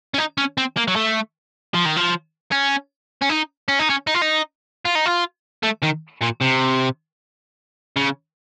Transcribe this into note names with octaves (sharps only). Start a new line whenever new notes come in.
C#4
D#4
C#4
C4
A#3
F#3
A3
F3
D#3
F3
C#4
C#4
D#4
C#4
D#4
C#4
D#4
F4
D#4
F4
D#4
F4
A3
D#3
A#2
C3
C#3